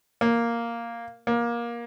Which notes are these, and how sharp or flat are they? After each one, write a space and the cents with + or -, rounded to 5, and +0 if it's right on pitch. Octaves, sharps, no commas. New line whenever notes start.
A#3 +0
A#3 +20